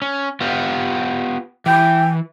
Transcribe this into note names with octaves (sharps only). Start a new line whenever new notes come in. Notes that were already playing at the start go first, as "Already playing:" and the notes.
C#4
B3 F4 G4
E3 G5